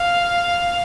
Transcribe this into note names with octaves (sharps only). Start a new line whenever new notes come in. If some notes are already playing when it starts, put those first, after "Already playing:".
Already playing: F5